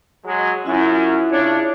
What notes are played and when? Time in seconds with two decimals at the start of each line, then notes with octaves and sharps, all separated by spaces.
0.24 F#3 G#3
0.66 F#2 C#4 E4 F4 E5
1.32 C#3 D4 C#5